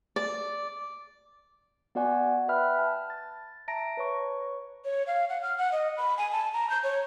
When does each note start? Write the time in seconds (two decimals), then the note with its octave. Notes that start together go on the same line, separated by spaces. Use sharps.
0.16 D5
1.95 B3 F#4 D5 F#5 G#5
2.48 B4 E5 G5 B5 F6 F#6
2.78 A5
3.10 A6
3.68 E5 A5 A#5 A#6 D7
3.97 B4 C#5 C#6
4.85 C#5
5.07 F5
5.29 F#5
5.42 F6
5.58 F#5
5.72 D#5
5.97 B5
6.18 G#5
6.32 A5
6.53 A#5
6.70 G6
6.83 C#5